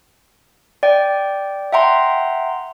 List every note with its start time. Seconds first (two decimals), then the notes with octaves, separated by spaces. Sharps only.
0.83 D5 G5
1.73 E5 F#5 G5 A#5 C6